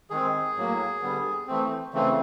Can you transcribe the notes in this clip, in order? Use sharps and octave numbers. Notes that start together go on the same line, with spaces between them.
D#3 G#3 C4 G#4
A2 F#3 A#3
D3 G3 B3
E3 A3 C4
C#3 E3 A3 C4